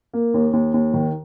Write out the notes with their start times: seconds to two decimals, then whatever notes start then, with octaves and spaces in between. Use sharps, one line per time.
0.13 A#3
0.34 D#2
0.53 D#2
0.74 D#2
0.94 D#3